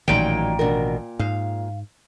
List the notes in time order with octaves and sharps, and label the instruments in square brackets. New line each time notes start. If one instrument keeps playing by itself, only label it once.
[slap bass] A1 D#3 [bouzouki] A#2 G5 [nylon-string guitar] F#3 G3 D#4
[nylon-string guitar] B2 D4 A#4
[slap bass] G#2 [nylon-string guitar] F5